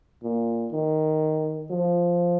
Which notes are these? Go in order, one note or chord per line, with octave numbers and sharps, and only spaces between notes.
A#2
D#3
F3